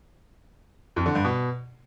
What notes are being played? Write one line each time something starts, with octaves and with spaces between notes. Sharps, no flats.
F2
D3
G2
B2